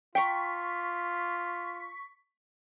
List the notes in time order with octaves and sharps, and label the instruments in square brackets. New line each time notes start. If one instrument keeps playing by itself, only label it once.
[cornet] F4 [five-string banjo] G5 A#5 [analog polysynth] C#6 B6